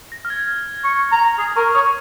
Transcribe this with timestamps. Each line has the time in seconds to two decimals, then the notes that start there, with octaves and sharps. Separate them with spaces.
0.12 A#6
0.25 F6
0.30 G#6
0.84 C#6
1.12 A#5
1.39 G#4 D#6
1.56 A#4 C#6
1.75 C#5 D#6